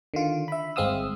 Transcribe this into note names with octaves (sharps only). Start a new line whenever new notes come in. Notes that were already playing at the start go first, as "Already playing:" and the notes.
D3 D#3 F4
E5 B5
G1 G#3 C4 F5 D#6 E6